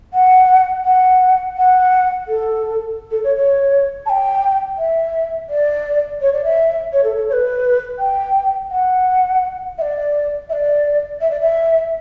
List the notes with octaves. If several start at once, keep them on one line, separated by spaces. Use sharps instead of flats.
F#5
F#5
F#5
A4
A4
C#5
C#5
A5
G5
E5
D5
C#5
D5
E5
C#5
A4
A4
C#5
B4
G5
F#5
E5
D5
E5
D5
E5
D5
E5